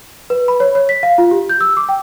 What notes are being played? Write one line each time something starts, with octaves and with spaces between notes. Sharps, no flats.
B4
B5
C#5
C#5
B6
F5
F4
G4
G6
E6
D6
G5